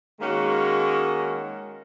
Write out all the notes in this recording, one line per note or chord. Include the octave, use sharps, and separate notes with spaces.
D#3 G#3 A#3 C#4 F#4